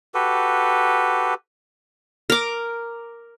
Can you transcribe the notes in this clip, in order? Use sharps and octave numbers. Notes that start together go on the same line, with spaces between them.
F#4 G4 A4 B4
A#4 D6